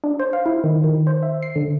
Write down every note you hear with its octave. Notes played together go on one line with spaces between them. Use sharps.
D4
C5
F5
E4
D#3
D#3
C5
E5
C7
D3